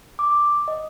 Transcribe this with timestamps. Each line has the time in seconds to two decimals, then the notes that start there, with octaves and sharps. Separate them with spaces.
0.19 D6
0.68 D#5